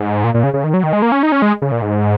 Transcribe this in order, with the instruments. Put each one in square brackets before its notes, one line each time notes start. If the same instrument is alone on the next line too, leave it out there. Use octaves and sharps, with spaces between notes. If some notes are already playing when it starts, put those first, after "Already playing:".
Already playing: [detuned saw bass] G#2
A#2
A#2
C#3
C#3
D#3
F#3
D#3
G#3
A#3
C#4
D#4
C#4
G#3
C#3
A#2
G#2